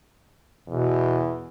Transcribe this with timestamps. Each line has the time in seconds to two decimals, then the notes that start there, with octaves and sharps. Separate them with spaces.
0.68 E2 B2